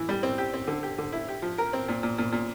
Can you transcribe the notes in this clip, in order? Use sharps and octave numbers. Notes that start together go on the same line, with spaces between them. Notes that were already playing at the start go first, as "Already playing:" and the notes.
Already playing: E3
G3
C4
G4
C4
D3
G4
D3
E4
G4
F3
A#4
C4
A#2
A#2
A#2
A#2